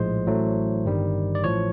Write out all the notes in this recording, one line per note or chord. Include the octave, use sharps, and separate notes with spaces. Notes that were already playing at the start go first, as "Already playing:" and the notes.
Already playing: A#1 A2 F3 G#3 C5
A1 A2 F#3 A3
G1 G2 D#3 G3
D5
A1 A2 F3 C#5